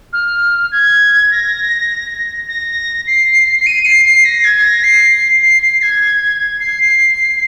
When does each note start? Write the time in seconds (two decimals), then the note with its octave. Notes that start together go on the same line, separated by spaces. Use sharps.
0.13 F6
0.72 G#6
1.31 A#6
2.48 A#6
3.07 C7
3.59 C7
3.66 D#7
3.85 C7
4.06 C7
4.25 A#6
4.44 G#6
4.64 A#6
4.83 C7
5.42 C7
5.62 C7
5.82 G#6
6.60 C7